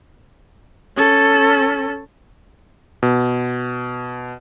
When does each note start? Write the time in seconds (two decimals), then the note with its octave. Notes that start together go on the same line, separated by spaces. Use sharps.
0.96 C#4 A4
3.03 B2